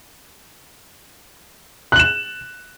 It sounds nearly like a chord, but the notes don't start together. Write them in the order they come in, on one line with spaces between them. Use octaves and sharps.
F#6 F#7 E7